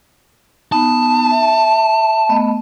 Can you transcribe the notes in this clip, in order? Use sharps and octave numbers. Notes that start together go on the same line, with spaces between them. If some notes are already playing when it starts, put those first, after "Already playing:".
B3 D#4 A5
E5
A3 B3 D#5